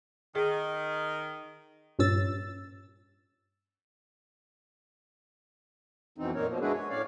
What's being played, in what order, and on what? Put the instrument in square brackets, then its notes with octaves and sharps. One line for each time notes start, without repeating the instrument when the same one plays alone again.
[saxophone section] D#3 [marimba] G#4
[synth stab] G2 A#2 C#4 E6 A6
[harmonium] F2 B2 E3 C4 D#4
F#2 A#2 A#3 D#4 A#4 C#5
B2 F3 A#3
G#3 D4 E4 F#4 G#4 B4
C#5
A2 C#4 C#5 D5 F5